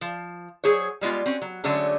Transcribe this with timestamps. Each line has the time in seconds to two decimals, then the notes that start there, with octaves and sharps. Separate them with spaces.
0.01 F3
0.64 F#3 G#4 C5 C#5
1.01 G3 G#3 B3 F4
1.26 C4 C#4 F#4
1.42 F#3
1.64 D3 F#3 G#3 A3 C#4 D4